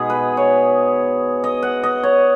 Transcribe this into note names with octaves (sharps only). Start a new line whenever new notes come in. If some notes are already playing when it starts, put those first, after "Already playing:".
Already playing: B2 G#3 B3 D#4 G#4
B4
C#5
D#5
F#5
D#5
C#5